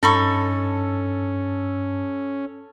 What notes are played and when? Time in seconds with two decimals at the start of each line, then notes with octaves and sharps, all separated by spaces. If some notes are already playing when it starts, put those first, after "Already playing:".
0.03 G2 C#4 D#4 A4 B5 C#6